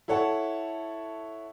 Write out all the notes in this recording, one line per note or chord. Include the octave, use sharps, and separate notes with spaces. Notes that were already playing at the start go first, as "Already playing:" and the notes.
E4 A4 C#5 F#5 A5